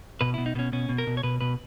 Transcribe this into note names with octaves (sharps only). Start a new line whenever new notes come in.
B2 B4
E4
B2
D#4
B2 B3 C#4
B2 C#4
B2
A#4
B2
C#5
B2 B4
B2 B4